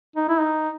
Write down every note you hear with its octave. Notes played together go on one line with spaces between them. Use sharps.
D#4
E4
D#4